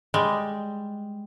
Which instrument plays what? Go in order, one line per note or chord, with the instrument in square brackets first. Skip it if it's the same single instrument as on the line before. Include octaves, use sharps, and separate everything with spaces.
[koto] G3 G#3